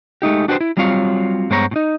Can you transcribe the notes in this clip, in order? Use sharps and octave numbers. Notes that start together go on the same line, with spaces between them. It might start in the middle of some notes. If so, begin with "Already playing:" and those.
G#3 A3 D#4 G4
D4 F#4 G4 A4 B4 C5
E4
F#3 G3 C4 F4 C#5 F5
G2 G#3 B3 C5 C#5 A#5
A2 D#4